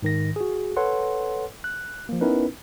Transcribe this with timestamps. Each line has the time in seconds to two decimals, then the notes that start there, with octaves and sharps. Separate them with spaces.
0.02 G#2 D#3 A#6
0.36 F#4 G#4
0.77 A4 B4 C#5 F#5 C6
1.64 F#6
2.09 F3 A#3
2.21 B3 C#4 D#4 E4 A#4 B4